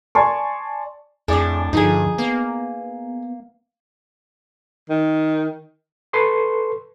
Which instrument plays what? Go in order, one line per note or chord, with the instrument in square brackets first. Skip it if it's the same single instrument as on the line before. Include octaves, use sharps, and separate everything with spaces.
[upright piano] D5 G#5 A5 C6 C#6
[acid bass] F2 [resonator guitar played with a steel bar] A2 D4 [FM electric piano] G#4 D5
[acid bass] G2 [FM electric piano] D3 F3 [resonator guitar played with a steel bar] D#4 G#4
[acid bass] A#3 [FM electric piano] B3
[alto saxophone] D#3
[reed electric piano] A4 B4 C6 C#6